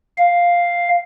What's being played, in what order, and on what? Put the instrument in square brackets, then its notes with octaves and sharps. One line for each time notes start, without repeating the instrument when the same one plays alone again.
[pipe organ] F5